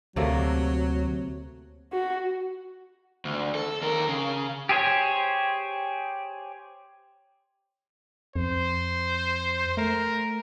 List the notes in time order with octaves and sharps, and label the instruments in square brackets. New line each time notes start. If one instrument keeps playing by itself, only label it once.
[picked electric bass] D2 [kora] C3 A3 A#3 [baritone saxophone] F#3
[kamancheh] F#4
[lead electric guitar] D2
A4
D#2 A#4
C#3
[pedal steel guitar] G4 G#4 C5 C#5
[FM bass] F2 [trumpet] C5
[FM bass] A3 [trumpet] A#4